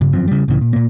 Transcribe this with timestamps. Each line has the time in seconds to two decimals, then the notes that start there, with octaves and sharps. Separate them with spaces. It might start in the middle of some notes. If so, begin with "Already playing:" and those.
0.01 G2 C#3
0.13 G1 F#2 F3 C4
0.28 C#3 G3
0.48 C2 A2 C#3 E3
0.61 A#2
0.73 A#2 A#3